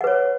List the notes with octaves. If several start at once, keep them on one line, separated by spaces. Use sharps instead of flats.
B4 C#5 F#5